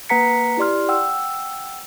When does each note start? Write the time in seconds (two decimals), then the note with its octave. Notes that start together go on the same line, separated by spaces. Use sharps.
0.09 A#3 B4 F#5 A#5 B6 C#7
0.57 E4 G4 D5 C6 F6
0.89 F#5 G5 E6